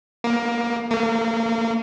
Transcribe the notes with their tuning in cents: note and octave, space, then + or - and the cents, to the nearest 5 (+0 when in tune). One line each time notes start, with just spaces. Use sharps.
A#3 +15
A#3 -35